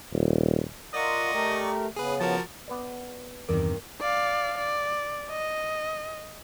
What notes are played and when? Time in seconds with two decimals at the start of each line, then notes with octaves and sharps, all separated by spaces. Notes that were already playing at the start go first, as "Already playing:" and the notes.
0.13 D#1
0.94 F4 A#4 D5 D#5 F#5 C#6
1.32 A3 G4 A#4
1.96 C#3 B3 G#4 B4
2.20 F3 F#4 A#4 A5
2.68 B3 B4 D5
3.49 E2 G2 C3 D#3 A#4 D6
4.01 D5 F5
4.58 D5
5.31 D#5